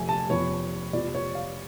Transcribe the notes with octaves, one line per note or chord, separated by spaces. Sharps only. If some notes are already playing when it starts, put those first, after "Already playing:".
Already playing: F1 F2 F3 A3 G#5
A5
F1 F2 F3 B3 C#5
F1 F2 F3 B3 D5
C#5
F5